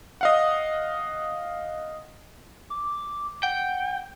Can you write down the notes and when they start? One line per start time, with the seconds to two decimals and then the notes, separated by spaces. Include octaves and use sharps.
0.21 D#5 F5 F#5
2.70 D6
3.43 F#5 G5